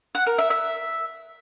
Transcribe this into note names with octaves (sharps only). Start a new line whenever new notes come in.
F#5
A#4
E5
E5